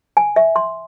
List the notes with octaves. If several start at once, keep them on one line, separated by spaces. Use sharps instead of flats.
G#5
E5
C6